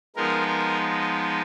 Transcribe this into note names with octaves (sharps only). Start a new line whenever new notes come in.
F3 G#3 B3 D#4 A#4
A#4